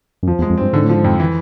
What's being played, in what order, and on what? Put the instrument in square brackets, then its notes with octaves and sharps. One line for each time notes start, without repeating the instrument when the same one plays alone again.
[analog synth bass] F#2
[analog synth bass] F2 [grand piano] F3
[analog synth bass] E2
[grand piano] G#3
[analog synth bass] F2
[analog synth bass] G2 [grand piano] C4
[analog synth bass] G#2 [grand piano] D3
[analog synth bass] A2
[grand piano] F3
[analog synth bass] G#2
[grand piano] F2
E3